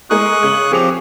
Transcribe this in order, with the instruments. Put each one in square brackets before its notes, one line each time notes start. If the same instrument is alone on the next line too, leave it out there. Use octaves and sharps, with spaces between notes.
[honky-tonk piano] G#3 G#4 A#4 [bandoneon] C#6 D#6 F#6
[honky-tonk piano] C#3 F#7
[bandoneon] F3 C4 G4 [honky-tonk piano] G#4 C#7 F7